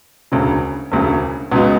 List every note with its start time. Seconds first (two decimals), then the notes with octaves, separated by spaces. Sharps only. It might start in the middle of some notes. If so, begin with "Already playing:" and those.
0.32 E1 D2 C#3
0.92 E1 D2 C#3
1.52 C#2 C#3 F#3 B3 D#4